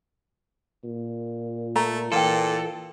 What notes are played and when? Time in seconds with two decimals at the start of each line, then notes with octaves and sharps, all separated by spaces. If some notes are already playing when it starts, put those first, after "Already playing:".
0.84 A#2
1.76 A3 A#5
2.12 A#2 E3 A4 F5 G5